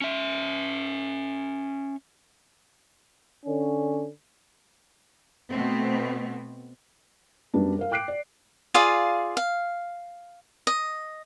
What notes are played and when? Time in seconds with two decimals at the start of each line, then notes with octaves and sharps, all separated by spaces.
0.02 C#4 E5
3.46 D3 C#4
5.50 B2 A3 B3 C4
7.54 F#2 G3 B3 D4
7.79 A#4 F5
7.91 G5 D6 F#6 C7 D7
8.08 D5
8.74 F4 G#4 D5 F5
9.37 F5
10.67 D#5